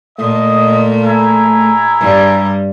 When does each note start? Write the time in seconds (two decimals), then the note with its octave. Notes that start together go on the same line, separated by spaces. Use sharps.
0.18 A#2 A3 D#5
1.04 E4 G#4 A#5
2.00 G2 G3